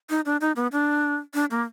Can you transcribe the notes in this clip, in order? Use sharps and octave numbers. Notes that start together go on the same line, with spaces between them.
D#4
D4
D#4
B3
D4
D4
A#3